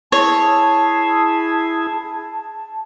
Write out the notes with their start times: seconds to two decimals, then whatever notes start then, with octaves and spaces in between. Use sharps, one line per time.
0.12 E4 G#4 C#5 A5